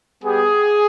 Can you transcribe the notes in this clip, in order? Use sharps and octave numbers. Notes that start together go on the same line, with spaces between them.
G3 B3 G4 G#4